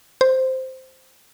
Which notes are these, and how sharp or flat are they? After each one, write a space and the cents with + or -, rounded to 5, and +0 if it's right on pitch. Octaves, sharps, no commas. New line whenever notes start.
C5 -5